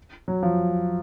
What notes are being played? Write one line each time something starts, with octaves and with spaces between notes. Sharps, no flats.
F#3
F3